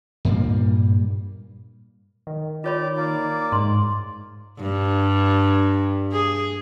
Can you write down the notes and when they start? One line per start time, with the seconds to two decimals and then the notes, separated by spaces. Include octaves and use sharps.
0.25 G2 A#2 G3 A#3
2.27 D#3
2.64 F4 C#5 D5 B5
2.97 A#3 D5
3.52 G#2 C6
4.61 G2
6.12 G#4